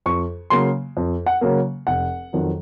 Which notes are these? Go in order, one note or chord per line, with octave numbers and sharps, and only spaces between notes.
F2 C#6
C#3 F#3 A#3 C6
F2
F#5
C#3 F#3 A#3
F1 F#5
F2 D#3 F#3